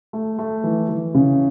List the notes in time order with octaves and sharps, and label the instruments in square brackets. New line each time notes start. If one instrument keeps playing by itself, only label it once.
[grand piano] A3
A3
E3
E3
C#3